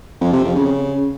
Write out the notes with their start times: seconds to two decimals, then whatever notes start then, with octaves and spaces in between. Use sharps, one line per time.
0.21 F2
0.32 C3
0.44 F2
0.55 C#3